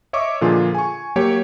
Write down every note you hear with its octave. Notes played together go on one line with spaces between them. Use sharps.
C#5 D#5 E5 C#6 D6
A#2 D3 F3 F4 G#4
G#5 C#6
F#3 A#3 G4 C#5